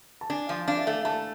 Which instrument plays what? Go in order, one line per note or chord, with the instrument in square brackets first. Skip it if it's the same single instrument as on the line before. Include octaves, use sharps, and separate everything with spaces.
[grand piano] A5
[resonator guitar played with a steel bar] D4 [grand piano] G#5
[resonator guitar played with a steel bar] F3 [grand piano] F5
[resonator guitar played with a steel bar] D4 [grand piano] F5
[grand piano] E5
[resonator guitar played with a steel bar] A3 [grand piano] F5
[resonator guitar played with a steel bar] A3 [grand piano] A5